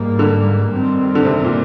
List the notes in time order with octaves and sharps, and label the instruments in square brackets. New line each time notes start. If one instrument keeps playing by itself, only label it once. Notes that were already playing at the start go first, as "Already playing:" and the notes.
Already playing: [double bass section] G#2 G3 A#3
[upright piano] D3
[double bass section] G2 D#3 G3 C4
[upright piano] D3
C3
A#2